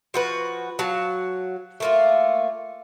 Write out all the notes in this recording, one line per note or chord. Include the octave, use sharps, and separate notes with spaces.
F3 F#4 B4
F#3 F#4 F5 A5
A3 A#3 F4